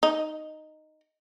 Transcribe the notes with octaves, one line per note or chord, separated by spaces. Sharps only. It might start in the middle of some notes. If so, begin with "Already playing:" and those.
D#4